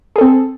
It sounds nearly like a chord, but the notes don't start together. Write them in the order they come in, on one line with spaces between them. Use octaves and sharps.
G#4 A4 C4